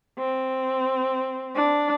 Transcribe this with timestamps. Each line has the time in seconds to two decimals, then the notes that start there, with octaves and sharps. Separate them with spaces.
0.18 C4
1.55 D4